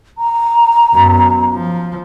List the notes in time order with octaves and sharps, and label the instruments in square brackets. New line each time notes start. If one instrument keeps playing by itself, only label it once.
[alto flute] A#5
[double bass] F#2 B3
F3